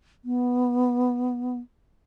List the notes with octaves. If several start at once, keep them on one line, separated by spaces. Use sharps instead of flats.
B3